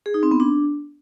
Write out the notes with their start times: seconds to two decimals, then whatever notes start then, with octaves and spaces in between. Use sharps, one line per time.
0.06 G#4
0.14 D#4
0.23 C4
0.31 B3
0.40 D4